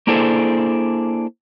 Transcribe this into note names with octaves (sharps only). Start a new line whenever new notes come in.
A#3 D4 E4 G#4 A4 C5